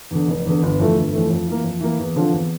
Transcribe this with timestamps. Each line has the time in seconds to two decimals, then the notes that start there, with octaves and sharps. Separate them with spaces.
0.11 E2 D3
0.28 F1
0.45 E2 D3
0.63 G1
0.79 F2 E3 A3
0.96 G1
1.13 F2 E3 A3
1.30 F2
1.48 E3 A#3
1.64 F2
1.81 E3 A#3
1.99 E2
2.16 D3 F3 C4 F4
2.33 E2